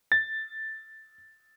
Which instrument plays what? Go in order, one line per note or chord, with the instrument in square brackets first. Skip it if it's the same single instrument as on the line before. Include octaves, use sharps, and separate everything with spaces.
[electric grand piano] A6